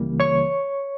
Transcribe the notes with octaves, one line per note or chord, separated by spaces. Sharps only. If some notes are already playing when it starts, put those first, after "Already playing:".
Already playing: C#2 C#3 E3 G3 A#3
C#5 C#6